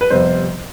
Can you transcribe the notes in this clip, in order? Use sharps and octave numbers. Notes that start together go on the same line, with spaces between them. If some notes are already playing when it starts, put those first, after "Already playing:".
B4
F2 C3 G3 B3 C5